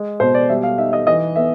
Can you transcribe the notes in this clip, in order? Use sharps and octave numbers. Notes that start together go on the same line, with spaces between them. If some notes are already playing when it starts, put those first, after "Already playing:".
Already playing: G#3
B2 C5
D5
G3 E5
F5
D#4 E5
D#5
E3 D#5
B3 E5